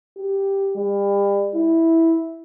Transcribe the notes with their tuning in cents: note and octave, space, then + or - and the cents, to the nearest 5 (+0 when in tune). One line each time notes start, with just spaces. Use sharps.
G4 +0
G3 +35
E4 -10